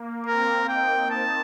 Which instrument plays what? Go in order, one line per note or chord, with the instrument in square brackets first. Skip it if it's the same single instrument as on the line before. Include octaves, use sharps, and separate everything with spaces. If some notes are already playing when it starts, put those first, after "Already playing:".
Already playing: [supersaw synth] A#3
[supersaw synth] C4 [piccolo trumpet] A#4
[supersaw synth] D#4 [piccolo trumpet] G5
[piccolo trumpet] A5